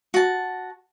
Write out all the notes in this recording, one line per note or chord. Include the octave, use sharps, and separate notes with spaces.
F#4 A5